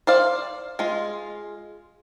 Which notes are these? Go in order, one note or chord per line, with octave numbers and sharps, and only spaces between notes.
C5 D5 F5
G#3 F4